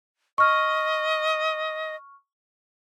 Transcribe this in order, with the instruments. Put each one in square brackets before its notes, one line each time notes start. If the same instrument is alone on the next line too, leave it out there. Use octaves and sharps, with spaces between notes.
[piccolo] D#5 [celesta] C#6 F6